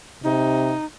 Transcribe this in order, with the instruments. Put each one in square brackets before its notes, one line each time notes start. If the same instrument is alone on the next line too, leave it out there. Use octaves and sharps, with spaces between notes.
[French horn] C3 [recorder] D#4